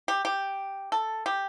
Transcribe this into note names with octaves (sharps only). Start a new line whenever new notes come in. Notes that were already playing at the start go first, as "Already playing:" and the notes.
G4
G4
A4
G4